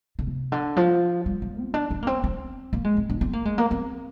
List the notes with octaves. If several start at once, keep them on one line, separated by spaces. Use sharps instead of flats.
D3
C3
D3
F3
G3
F3
C4
D4
D4
A#3
C4
C4
A#3
G#3
C4
D4
C4
A#3
G#3
A#3
C4